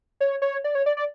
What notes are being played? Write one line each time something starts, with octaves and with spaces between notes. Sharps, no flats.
C#5
C#5
D5
C#5
D5
D5